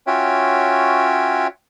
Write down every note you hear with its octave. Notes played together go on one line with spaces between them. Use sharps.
C#4 F4 F#4 C#5 E5 G5